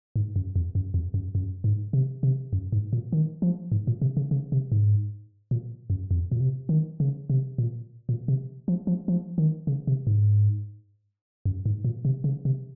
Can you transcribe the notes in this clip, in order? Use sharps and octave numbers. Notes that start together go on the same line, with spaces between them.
G#2
F#2
F2
F#2
F2
F#2
F#2
G#2
C3
C3
F#2
G#2
A#2
D#3
F3
G#2
A#2
C3
C#3
C#3
C3
G#2
A#2
F#2
F2
A#2
C3
D#3
C#3
C3
A#2
A#2
C3
F3
F3
F3
D#3
C#3
C3
G#2
F#2
G#2
A#2
C3
C#3
C3